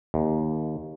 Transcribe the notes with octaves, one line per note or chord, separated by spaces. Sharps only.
D#2